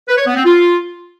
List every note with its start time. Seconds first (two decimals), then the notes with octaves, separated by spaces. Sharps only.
0.08 B4
0.18 C#5
0.27 B3
0.36 C4
0.45 F4